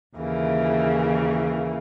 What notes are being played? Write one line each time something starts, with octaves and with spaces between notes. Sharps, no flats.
D#2 C#3 E3 A#3